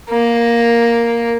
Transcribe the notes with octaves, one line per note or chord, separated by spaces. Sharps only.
A#3